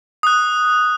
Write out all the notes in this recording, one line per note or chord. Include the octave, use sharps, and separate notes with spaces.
D#6 F#6